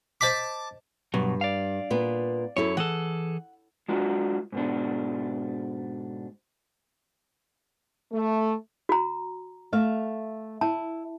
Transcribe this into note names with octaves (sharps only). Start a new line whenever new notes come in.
C5 D#5 A5 D6 B6
G2 B2 F#3
D5 F5
A#2 B3
F#2 E4 A4 C#5
E3 G#4 A4 F#5
G#3 D4 F4 F#4
G#2 B2 D4
A3
F#4 A#5
A3 E5 F5
E4 A5